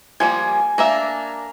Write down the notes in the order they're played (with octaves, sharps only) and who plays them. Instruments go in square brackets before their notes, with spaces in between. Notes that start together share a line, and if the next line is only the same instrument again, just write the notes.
[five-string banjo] F3 G3 A#3 [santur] G#5
[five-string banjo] A#3 D4 E5 [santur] A#5